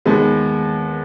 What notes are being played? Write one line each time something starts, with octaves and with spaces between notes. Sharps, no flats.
D#2 D#3 G#3 B3